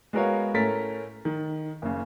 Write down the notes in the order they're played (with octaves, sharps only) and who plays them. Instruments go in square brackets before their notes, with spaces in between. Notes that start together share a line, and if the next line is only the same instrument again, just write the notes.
[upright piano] G#3 B3 F#4 A#4 C#5 F5
A2 A3 C#4 A#4 A6 B6
D#3
F#1 C#3